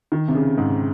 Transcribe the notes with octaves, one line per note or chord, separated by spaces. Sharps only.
D#3
C3
C#3
G#2